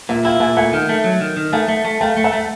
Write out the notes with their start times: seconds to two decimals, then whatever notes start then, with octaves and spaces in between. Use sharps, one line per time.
0.09 A#2 E5 F#5
0.25 E4 F5 G5
0.40 A#2 F#5 G#5
0.57 A3 F#5 G#5
0.73 D#3
0.89 A3
1.04 F#3
1.21 D#3
1.36 D#3
1.52 A3 F#5 G#5
1.68 A3
1.85 A3
2.01 A3 F5 G5
2.17 A3
2.24 E5 F#5
2.33 A3